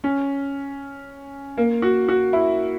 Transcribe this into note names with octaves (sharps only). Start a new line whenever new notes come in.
C#4
A#3
F#4
F#4
E4